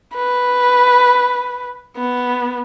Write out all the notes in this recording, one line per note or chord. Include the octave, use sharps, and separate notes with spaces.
B4
B3